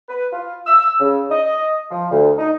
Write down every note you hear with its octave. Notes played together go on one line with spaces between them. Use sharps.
B4
F4
E6
C#3
D#5
F3
D2
D#4